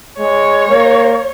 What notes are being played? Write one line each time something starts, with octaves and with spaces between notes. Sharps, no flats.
G#3 C#5
A#3